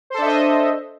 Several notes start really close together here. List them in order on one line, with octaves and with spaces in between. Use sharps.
C5 A4 D4 E5 D#5